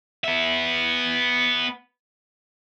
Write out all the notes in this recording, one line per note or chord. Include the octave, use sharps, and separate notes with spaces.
B3 E5